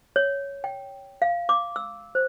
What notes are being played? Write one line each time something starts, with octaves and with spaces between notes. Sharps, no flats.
C#5
G5
F5
D6
E6
C5